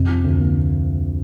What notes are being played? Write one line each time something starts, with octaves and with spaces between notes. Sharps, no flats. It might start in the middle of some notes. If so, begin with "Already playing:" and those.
Already playing: F2 C3
F3
D2
A#3